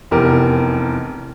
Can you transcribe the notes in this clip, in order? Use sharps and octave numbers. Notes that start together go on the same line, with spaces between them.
F1 E2 G4 A#4